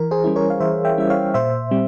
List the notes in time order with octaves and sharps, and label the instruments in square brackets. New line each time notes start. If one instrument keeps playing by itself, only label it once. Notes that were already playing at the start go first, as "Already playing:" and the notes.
Already playing: [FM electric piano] E3 A#4
G#4 C5
G3 C#4 E4
A#4 C#5
F5
E3 C5 E5
E5 G5
G3 C#4 E4 E5
C#5 F5
A#2 C5 E5
G3 C4